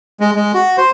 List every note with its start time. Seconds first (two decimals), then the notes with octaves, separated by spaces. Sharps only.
0.20 G#3
0.35 G#3
0.54 F#4
0.78 C5